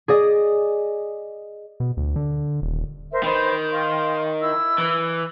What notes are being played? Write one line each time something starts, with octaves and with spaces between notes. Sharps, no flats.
G#4 D5 D#5
B2
D2
D3
D#1
A#4 C5 E5
D#3 B4 C5
F5 C6
E4 E6
E3